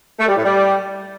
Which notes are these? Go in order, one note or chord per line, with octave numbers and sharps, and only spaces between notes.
A3
G3
A2
G3